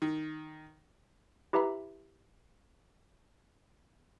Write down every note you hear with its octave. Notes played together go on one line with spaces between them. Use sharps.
D#3
E4 G4 B4 E5 A#5 B5